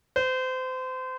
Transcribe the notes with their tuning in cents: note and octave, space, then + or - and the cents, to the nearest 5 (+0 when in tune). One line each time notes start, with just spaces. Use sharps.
C5 -30